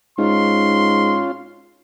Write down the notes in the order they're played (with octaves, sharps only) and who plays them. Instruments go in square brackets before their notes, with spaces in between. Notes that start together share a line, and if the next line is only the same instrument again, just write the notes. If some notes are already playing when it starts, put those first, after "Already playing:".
[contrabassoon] G#2 [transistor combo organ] C#4 F4 [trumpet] C6